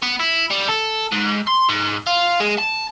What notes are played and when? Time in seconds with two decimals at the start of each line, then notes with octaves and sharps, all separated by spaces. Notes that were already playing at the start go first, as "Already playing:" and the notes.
0.02 B3
0.20 E4
0.51 G3
0.68 A4
1.12 G#2
1.47 C6
1.69 G#2
2.07 F4
2.40 G#3
2.59 A5